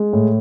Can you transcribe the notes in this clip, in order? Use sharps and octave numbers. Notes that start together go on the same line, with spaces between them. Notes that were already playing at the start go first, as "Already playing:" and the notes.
Already playing: G#3
A2